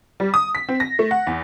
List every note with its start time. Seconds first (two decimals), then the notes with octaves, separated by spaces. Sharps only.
0.20 G3
0.34 D#6
0.55 B6
0.69 C4
0.80 A#6
0.99 A3
1.11 F#5
1.27 E2